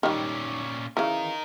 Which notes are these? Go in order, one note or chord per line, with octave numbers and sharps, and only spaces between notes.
A#2 D#3 G3 C#4
C#3 E3 D#4 A#4